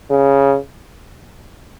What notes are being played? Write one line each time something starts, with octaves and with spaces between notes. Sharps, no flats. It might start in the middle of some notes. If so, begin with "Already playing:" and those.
C#3